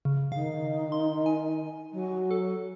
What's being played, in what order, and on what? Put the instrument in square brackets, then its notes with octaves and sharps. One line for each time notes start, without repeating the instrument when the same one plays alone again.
[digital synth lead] C#3
[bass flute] D#3 [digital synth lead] F5
[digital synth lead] C6
G#5
[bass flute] F#3
[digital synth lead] A4